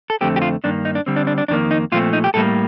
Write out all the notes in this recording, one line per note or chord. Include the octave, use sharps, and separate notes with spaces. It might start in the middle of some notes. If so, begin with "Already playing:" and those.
A4
F2 D3 A3 C4 G4
G4
F4
G2 D#3 A#3 D4
D#4
D4
D3 G3 C4
D4
D4
D4
F2 D#3 G3 A#3 D4
D#4
A#2 F3 A3 C4 F4
D#4
G4
A2 G3 A#3 A4